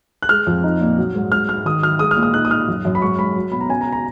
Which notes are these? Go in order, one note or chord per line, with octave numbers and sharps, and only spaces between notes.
F#6
G#3 F6
F2
D#4
A#2
F#3
G#2
G#2 F6
G#2 F6
D#3 D#6
F#3 F6
G#3 D#6
F6
A#2
D#6
D#4 F#6
D#6
D#4 F6
F#2
F#2
B5
G#2 C#6
G#2 B5
F#3
B2 B5
A#5
C#4 G#5
A#5
A#5